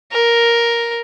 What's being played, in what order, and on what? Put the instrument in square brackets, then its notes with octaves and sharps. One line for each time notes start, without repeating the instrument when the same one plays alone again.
[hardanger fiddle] A#4